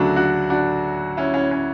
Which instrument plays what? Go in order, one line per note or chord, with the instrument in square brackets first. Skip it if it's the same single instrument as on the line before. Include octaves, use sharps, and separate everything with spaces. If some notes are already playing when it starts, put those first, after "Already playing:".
Already playing: [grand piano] D2 C#3 F#3 A3 D4 F#4
D4 F#4
D4 F#4
C#4 E4
C#4 E4
C#4